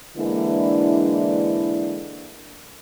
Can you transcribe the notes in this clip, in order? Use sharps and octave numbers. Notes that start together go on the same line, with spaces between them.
D3 E3 G#3 A#3 D4 E4